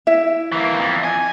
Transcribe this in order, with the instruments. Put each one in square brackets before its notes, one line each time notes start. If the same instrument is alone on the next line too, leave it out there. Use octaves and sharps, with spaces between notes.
[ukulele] E4 E5
[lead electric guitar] E3 A#3
F2
G#5